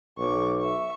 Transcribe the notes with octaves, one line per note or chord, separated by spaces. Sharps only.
B1 C#6 D6
E5 C#6